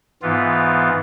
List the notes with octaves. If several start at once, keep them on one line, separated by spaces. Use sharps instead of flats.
G#2 E3 B3 F4